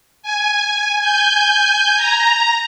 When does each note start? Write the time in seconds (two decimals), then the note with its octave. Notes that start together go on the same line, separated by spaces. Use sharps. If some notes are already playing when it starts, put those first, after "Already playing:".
0.23 G#5
1.00 G#5 G6
1.97 A#5